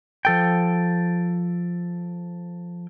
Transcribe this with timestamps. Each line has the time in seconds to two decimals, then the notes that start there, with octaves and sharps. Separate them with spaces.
0.25 F3 A4 G5